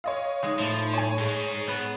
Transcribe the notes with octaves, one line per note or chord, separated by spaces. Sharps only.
C#5 D#5 F5
G#3 D#4
A2 F3
C#5 G#5
G#2 G#4
B3 B4